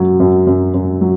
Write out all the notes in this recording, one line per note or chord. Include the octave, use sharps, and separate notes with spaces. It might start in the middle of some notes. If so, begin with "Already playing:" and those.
Already playing: F#2 F#3
F#2
F#2
F#2
F#3